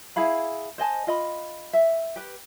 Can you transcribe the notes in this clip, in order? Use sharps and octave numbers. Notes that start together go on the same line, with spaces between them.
E4 G#4 F5 B5
C5 D#5 G#5 A5
F4 D#5 B5
E5
G4 B4